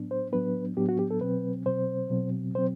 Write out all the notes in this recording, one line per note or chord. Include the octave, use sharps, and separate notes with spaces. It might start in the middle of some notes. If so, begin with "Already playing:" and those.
Already playing: A2 F#3 B3 D4
C5
A2 F#3 B3 D4 B4
A2 F#3 B3 D4 G4
F#4
G4
A4
B2 F#3 C4 B4
B2 F#3 C4 C5
B2 F#3 C4
B2 F#3 C4 C5